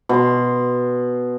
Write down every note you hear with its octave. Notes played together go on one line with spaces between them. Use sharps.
B2 C6